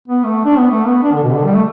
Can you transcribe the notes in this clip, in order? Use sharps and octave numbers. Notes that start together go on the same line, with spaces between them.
B3
A3
D4
B3
A3
B3
D4
D3
B2
D3
G3
A3